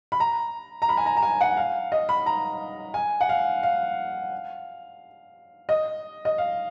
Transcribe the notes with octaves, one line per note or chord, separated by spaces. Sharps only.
B5
A#5
A#5
B5
G#5
A#5
A#5
G#5
F#5
F5
D#5
B5
A#5
G#5
F#5
F5
F5
D#5
D#5
F5